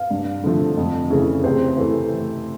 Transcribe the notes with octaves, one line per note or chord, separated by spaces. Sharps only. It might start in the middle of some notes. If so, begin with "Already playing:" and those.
Already playing: F5
G2
D3 F3 A3
F2
C#3 E3 A3
C3 C5
E3 A3